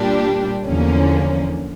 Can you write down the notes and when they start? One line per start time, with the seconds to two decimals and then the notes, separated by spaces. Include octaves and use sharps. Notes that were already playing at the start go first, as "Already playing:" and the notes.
Already playing: A#2 G3 D4 G4
0.66 E2 D3 F3 A#3 C#4